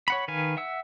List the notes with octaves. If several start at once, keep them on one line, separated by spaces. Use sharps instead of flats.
C#5 F#5 B5
D#3 B4 F5 G#5
E5 F#5 E6